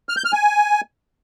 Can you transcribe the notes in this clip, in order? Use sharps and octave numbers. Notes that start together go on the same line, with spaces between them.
F6
G6
F6
G#5